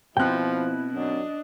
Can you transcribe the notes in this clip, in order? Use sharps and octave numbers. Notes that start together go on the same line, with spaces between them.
B2 F3 C4 E4 G5 F#6
F#2 D4 D#5